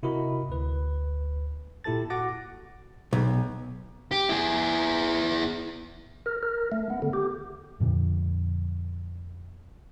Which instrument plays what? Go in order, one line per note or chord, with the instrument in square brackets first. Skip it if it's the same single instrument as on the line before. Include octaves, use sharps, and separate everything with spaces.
[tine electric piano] C3 E4 F#4 A#4 D#5 B5
D2 B4
A#2 E4 G4 A4 A5 A6
F#4 F#5 D6 A6 A#6
[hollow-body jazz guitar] B1
[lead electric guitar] G4
E4 G#4
[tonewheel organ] A#4
A#4
A3
B3
D3
G4
[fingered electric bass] F2 A#2 D3